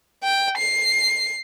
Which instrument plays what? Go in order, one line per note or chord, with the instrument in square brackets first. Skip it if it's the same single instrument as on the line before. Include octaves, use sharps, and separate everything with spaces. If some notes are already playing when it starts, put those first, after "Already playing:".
[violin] G5
C7